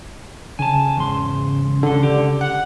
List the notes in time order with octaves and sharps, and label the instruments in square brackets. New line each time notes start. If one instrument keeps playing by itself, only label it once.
[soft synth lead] C#3 [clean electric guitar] G#5 A5
[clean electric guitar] E2 G#2 C6
[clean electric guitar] C#2 A4 [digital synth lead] D3
[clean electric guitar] G4
[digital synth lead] F#5